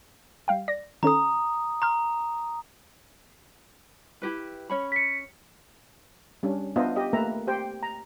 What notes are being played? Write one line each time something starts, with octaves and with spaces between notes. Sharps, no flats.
G3 F5 G5
D5 A#6
D#3 C#4 A4 A#5 D#6
A#5 C6 F6
E4 G4 B4
C#4 C#5 B5
B6 C#7
G3 C#4 D4
B3 D4 F4 C5 D#5 E5
G4 D#5
A3 A#3 A#4 B4 E5 A#5
G4 C5 G5
A#5